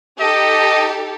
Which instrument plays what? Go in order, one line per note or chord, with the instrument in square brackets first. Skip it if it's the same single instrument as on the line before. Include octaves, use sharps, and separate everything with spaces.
[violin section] D#4 G4 A4 [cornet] D#5